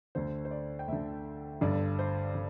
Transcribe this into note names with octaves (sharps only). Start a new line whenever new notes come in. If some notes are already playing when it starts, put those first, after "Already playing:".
D2 D3 C5
C5
D5
G5
D2 D3 E5
G1 G2 D3 D5
C5
D3